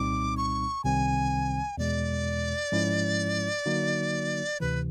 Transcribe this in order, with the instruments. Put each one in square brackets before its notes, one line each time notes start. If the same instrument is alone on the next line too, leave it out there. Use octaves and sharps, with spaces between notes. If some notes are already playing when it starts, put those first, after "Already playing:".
Already playing: [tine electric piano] C2 A#2 G3 C4 D#4 [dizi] D6
[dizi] C#6
[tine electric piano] C2 C3 D#3 G3 C4 [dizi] G#5
[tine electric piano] E2 B2 G#3 [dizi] D5
[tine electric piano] G#2 F3 G#3 C#4 E4
D3 F#3 A#3 D#4 F#4
[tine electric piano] D2 C3 E3 [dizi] B4